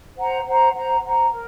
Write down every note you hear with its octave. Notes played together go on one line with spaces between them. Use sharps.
C5 F#5 A#5
C5 F#5 A#5
C5 F#5 A#5
C5 F#5 A#5
A#4